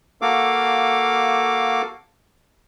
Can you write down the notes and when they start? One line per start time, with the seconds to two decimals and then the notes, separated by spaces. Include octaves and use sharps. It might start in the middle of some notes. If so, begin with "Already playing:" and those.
0.22 A#3 F#4 A4 F5 D6